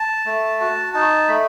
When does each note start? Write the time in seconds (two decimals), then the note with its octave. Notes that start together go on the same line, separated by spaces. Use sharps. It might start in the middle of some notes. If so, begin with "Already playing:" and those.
Already playing: A5
0.26 A3
0.60 F#4
0.94 D#4 A5
1.28 A3 B5